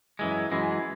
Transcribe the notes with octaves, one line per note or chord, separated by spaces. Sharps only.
F#2 E3 G#3
F#2 E3 G#3